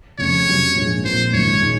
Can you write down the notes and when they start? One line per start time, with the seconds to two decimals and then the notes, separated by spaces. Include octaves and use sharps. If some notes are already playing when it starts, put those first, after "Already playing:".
0.19 F1 F2 C#3 C#5
0.47 C3 F#3 C#4
0.75 A#1 G#2 F3 G#3
1.04 A#2 F3 C4 C5
1.33 G#1 F#2 D#3 C#5
1.61 A#2 G#3 D#4